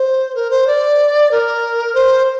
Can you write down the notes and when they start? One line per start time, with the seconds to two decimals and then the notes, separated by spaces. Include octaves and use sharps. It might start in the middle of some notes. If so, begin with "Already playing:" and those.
Already playing: C5
0.35 A#4
0.50 C5
0.67 D5
1.31 A#4
1.94 C5